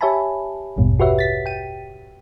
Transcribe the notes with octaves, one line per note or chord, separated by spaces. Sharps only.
G4 C#5 E5 G#5 A5 B5
A1 E2 G2 B2
F#4 G4 B4 C#5 E5 F#5
A6 B6
G5 D#7